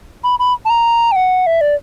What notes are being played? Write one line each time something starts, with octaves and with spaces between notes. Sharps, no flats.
B5
B5
A5
A#5
G5
F#5
E5
D5